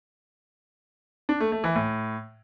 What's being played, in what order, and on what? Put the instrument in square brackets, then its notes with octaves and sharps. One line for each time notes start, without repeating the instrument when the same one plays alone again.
[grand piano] D4
A3
A3
E3
A2